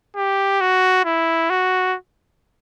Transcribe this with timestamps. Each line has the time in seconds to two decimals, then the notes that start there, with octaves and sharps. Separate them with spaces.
0.16 G4
0.61 F#4
1.05 E4
1.50 F#4